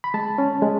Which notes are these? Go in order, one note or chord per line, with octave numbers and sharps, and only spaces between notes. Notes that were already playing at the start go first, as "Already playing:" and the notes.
B5
G#3 A5
C#4
G#3